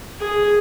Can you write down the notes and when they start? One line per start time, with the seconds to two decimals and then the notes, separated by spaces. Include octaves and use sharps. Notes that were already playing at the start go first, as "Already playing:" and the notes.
0.20 G#4